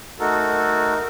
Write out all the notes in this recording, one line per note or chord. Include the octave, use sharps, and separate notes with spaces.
A3 D#4 F#4 A4 A#4